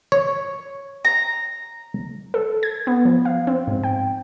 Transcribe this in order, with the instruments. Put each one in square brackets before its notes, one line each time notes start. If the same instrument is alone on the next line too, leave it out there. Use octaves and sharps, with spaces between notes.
[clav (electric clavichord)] C#5
[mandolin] A#5
[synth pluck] A4
G#6
B3
F3
F5
C4
G#2
G5